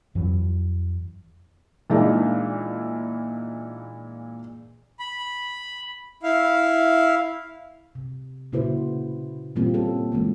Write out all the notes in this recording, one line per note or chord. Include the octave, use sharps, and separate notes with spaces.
F2 E3 F#3
A#2 E3 G#3 D4 D#4
B5
E4 F5
C3
A#2 C#3 E4 F#4 B4 C5
A#2 E3 G3 A#3 C4 F4
C#4 A4
E3 G#3 A#3